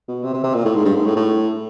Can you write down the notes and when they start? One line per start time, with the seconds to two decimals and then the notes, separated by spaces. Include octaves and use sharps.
0.08 B2
0.24 C3
0.34 C3
0.44 C3
0.54 A#2
0.65 A2
0.75 G#2
0.85 G2
0.96 G#2
1.06 A2
1.16 A2